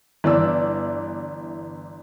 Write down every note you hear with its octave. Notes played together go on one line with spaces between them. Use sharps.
G1 E3 D5 E6